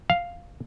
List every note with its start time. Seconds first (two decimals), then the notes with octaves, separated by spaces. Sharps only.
0.10 F5